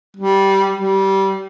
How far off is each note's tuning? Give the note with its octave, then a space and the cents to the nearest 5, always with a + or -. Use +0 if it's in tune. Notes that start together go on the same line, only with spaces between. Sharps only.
G3 -10
G3 -20